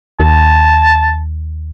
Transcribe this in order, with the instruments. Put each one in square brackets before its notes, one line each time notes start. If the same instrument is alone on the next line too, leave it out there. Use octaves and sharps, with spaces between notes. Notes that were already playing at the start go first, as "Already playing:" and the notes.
[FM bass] D#2 [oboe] A5